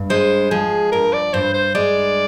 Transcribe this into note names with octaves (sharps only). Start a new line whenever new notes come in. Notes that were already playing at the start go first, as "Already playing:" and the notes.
Already playing: G2
G#3 C5
F3 G#4
G2 A#4
D5
G2 C5
C5
G#3 D5